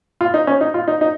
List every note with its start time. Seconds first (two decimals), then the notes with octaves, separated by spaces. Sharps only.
0.21 F4
0.34 D#4
0.47 C#4
0.61 D#4
0.74 F4
0.88 D#4
1.01 D#4